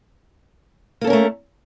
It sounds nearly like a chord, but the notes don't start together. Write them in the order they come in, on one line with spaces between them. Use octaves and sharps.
A#3 A4 C#4 A#4 A3